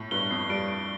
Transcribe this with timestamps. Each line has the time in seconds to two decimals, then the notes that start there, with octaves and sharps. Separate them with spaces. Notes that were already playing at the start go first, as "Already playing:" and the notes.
Already playing: A2
0.11 G2 G7
0.31 F2 C7
0.49 G3 D7
0.68 D7